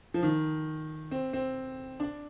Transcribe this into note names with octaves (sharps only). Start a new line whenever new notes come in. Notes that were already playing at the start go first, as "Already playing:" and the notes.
F3
D#3
C4
C4
D4